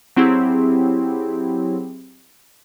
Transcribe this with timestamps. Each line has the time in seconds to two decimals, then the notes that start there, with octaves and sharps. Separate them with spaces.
0.16 F#3 C4 E4 G4 G#4